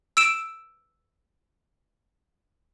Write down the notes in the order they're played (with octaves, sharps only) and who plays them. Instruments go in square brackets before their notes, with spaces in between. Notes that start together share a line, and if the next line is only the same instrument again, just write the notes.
[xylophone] E6 D7 E7